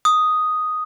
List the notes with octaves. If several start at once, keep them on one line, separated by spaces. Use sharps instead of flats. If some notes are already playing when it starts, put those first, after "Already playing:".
D#6